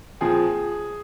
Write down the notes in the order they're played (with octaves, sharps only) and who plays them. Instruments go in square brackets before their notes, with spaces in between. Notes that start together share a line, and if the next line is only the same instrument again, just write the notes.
[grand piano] A#2 F3 C4 G#4